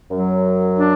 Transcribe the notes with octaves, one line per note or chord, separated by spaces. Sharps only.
F#2 F#3
D4